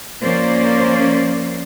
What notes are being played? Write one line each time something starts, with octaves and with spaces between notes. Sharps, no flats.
F3 A#3 C#4 C5 D5